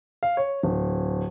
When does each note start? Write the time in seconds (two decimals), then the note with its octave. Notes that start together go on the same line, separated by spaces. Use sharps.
0.23 F5
0.37 C#5
0.63 D1